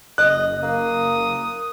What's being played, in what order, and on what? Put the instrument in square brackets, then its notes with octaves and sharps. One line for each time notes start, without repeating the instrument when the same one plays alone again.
[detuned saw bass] F#1 [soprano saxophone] D#5 [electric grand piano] F#6
[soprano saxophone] A#3 [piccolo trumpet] D#6